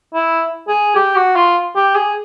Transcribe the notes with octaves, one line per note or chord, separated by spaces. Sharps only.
E4
G#4
G4
F#4
F4
G4
G#4